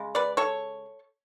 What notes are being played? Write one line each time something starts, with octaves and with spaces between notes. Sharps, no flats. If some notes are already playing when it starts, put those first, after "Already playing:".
Already playing: C#3 G#3
B4 D5
A4 C#5